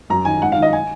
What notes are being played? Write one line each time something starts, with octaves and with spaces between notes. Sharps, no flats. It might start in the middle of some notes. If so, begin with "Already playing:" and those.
F#2 A#5
D#3 G#5
G#2 F#5
F5
D#3
D#5
G#5